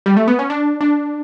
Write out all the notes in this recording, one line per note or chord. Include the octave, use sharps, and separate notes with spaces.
G3
A3
B3
C#4
D4
D4